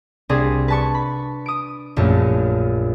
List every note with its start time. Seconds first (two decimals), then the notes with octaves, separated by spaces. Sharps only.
0.29 C2 C4 D4 G#4
0.68 B4 A5 C#6
0.95 B5
1.46 D#6 D7
1.96 A#1 F#2 A3